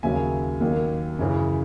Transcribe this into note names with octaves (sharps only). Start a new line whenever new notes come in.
D#2 C#3 F#3 E5 G#5
D#2 D#3 F#3
F#2 C#3 E3